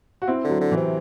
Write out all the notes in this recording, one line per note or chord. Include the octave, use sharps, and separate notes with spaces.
F#4
C4 E4
D3
F#3
D3
E3
C3